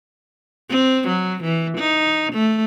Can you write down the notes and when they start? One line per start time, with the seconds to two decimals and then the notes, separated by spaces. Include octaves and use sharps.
0.70 C4
1.08 F#3
1.44 E3
1.78 D#4
2.33 A3